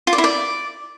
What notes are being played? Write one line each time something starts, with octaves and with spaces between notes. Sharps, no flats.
F4
D5
E4
D5